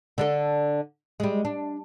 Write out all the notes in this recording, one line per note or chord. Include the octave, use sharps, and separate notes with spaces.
D3 D4 A4
G3 G#3
D4